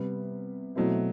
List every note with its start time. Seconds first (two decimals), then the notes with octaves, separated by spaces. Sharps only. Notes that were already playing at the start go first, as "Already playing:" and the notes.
Already playing: C3 G3 B3
0.75 B2 F#3 A3 C4 E4